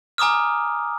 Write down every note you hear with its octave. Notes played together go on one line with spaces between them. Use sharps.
G#5 A#5 D6 D#6 F6